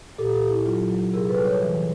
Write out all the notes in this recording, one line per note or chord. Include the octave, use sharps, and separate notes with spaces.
A#2 G4 A4
G4 A4
A#2
E4
F#3 F4
F#3
C3 G#4 A#4
A4 B4
G3
B4 C#5
E3